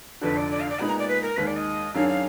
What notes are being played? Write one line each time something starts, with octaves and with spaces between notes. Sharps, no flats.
F1 F2 D3 B4
D5
D5
F5
D5
A#2 G#3 B3 D#4 G#4 B5
A#5
D5
B4
A#4
D#2 D#3 G#3 B4
D5
D#5
F#2 D#3 F#3 D4 G#4 F5
F5